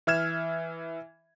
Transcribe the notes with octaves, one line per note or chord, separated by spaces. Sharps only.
E3 E5 F6 G#6 E7